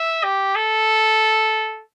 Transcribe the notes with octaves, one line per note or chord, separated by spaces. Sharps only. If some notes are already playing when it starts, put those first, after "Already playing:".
Already playing: E5
G4
A4